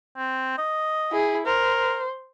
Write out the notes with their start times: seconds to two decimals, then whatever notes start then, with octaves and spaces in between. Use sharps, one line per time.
0.17 C4
0.58 D#5
1.12 E4 G#4
1.46 A#4 C5